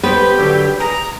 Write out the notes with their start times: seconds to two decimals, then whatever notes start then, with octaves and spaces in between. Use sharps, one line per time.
0.04 B3 G4 B4 C5
0.38 D3 F#3 G3
0.80 G#4 A#5